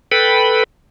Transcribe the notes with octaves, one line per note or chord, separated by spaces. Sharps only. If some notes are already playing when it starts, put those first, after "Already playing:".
A4 B4 G5 B5